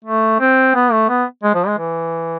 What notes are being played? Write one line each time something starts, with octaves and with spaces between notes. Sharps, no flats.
A3
C4
B3
A3
B3
G#3
F3
G#3
E3